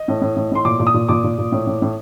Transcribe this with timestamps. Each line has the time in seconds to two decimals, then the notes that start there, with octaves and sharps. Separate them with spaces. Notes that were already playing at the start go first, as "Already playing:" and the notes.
Already playing: D#5
0.08 A2
0.22 A2
0.36 A2
0.52 A2 C6
0.65 A#2 D6
0.80 A#2
0.87 D#6
0.94 A#2
1.09 A#2 D6
1.24 A#2
1.38 A#2
1.52 A2
1.67 A2
1.82 A2